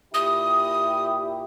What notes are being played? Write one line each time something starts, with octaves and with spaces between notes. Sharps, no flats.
A#2 E4 G4 D#6